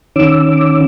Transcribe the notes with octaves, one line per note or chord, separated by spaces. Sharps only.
D#3 C#4 D6 E6